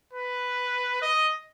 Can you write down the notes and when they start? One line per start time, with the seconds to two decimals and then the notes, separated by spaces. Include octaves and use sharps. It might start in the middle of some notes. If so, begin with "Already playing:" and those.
0.13 B4
1.02 D#5